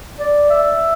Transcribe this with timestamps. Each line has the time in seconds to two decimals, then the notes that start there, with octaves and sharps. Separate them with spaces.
0.19 D5
0.50 E5